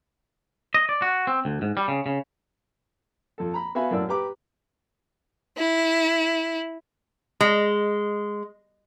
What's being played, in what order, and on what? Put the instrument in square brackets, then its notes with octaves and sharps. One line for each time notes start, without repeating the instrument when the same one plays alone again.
[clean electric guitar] D#5
D5
F#4
C4
D2
G#2
G3
C#3
C#3
[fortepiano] F2 A4
A#5 B5
B3 F#4 E5 F5 G#5 B5
F#2 A2 A#3 D5 E6
G4 B4 A#5 D6
[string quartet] E4
[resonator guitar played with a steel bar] G#3